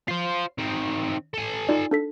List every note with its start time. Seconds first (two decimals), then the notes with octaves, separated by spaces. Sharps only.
0.08 F4 C5 C7
0.58 D#3 C4
1.34 A4 G#5
1.69 D#4 F4 D5
1.91 D4 A4 B6